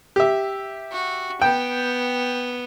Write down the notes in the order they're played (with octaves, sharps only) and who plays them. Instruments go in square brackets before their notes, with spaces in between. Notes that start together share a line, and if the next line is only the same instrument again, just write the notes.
[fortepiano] G4 E5
[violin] F#4
[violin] B3 [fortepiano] G5